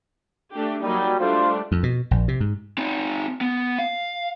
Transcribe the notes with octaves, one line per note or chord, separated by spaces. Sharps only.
A3 D4 G4
F#3 G3 A#3 D#4
G3 A3 D4 F4 C5
F2
B2
A#1
C3
G#2
C4 D#4
B3
F5